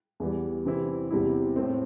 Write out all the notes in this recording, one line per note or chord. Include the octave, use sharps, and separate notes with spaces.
E2 E3 G3
C3 E3 C4 E4
E2 C3 G3 C4 E4
A2 A3 C4